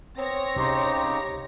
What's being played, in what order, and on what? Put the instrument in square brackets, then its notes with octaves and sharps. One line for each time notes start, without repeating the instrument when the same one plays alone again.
[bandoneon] B3 [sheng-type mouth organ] C4 [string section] C#5 A#6
[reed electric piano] C2 C6 [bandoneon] C#3 D#4 G4